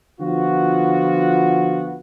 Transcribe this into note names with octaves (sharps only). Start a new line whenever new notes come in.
D3 F3 B3 F4 F#4